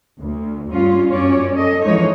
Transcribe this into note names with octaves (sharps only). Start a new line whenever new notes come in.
D2
G2 C#4 F4
F#2 C#4 C#5 D5
A4 D#5
E3 F3 G#3 D#4 C#5